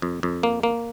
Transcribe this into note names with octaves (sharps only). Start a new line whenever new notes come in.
F2
F2
A#3
A#3